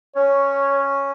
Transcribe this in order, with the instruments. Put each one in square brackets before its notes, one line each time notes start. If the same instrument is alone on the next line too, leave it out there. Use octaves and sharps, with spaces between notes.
[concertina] C#4 [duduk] C#5